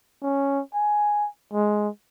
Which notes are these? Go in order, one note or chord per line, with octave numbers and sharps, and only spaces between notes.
C#4
G#5
G#3